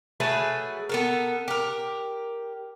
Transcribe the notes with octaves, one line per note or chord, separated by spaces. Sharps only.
F#3 A3 G#4 B4
B3 A4 A#4
G4 A#4